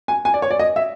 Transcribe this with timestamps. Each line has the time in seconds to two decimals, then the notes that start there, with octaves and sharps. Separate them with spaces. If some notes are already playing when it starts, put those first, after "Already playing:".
0.08 G#5
0.25 G#5
0.34 D5
0.42 C#5
0.51 D5
0.59 D#5
0.76 E5